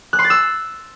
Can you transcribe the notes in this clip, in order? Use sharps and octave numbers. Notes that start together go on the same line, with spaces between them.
F#6
C6
A6
E6